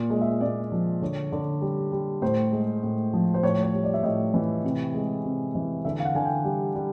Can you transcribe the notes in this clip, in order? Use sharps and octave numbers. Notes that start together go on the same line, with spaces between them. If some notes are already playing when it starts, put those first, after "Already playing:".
Already playing: A#2
G#3
E5
A#2 D5
F3
D3 C#5
D3
G3
G3
A2 C5
G#3
A2
F3
C5
A2 C#5
C#5
G3
D5
E5
A2 D#5
E3
C3
G#3
C3
E3
D3 E5
F5
F#5
D3 G#5
G5
G3
G3